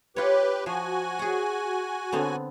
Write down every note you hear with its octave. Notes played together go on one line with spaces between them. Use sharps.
F4 G4 B4 C#5
F3 F#4 G#5
G#4 F#5
D3 B3 C4